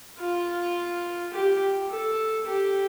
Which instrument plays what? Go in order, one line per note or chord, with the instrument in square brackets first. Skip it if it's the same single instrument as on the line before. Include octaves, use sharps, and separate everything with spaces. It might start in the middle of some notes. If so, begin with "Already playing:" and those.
[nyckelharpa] F4
G4
A4
G4